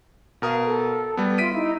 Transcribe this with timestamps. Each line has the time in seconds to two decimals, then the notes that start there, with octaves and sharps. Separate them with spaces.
0.42 B2 A#4 F5 D#6
0.64 A4
1.17 G3 B3
1.38 F4 E5 B6 D7 D#7
1.52 D#4 E4